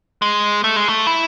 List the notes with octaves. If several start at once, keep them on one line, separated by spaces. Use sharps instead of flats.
G#3
A3
G#3
A3
E4